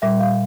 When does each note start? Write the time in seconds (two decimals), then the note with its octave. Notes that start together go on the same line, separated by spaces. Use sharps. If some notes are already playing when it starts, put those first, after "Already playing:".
0.02 A#2 G3 E5
0.20 F5